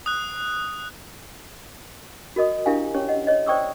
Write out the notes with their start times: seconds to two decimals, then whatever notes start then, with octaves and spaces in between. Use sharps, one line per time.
0.06 D#6 F#6
2.36 F#4 A#4 D#5 D#6
2.66 D4 E4 G4 A#4 F5 G#5
2.94 C#4 G4 C#5
3.08 D#5 F#5
3.27 C#5 D#5
3.46 C5 D5 G5 C#6 D#6 E6